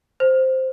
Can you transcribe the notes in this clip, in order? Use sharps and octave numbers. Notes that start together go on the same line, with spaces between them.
C5